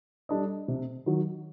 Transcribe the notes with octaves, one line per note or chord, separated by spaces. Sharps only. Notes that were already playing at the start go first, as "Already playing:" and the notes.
G3 D4 A4 D#5
C3
D#3 F#3